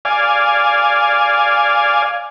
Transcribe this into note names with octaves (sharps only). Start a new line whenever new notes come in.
D5 F5 G#5